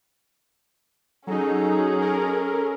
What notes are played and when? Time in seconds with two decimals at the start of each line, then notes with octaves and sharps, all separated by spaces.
1.27 F#3 C#4 D#4 G#4 A4
2.01 A4 A#4